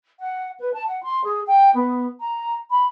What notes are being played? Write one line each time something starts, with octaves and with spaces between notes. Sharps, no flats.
F#5
B4
A5
F#5
C6
G#4
G5
B3
A#5
B5